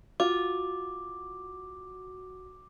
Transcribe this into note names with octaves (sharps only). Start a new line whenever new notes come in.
F4 F#4 D6